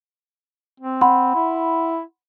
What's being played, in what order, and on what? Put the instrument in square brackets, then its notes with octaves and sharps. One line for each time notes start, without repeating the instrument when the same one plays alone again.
[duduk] C4
[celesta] F#5 B5 C6
[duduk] E4